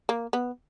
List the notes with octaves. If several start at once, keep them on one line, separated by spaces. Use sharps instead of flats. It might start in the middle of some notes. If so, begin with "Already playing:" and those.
A#3
B3